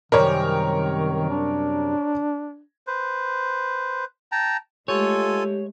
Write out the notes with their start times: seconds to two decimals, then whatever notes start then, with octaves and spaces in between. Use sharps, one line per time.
0.12 F#2 C3 D#3 G3 A#4 C#5
1.30 D4
2.87 B4 C5
4.32 G5 A5 A#5
4.88 G#3 A3 F4 G4 A4 C#5 G#5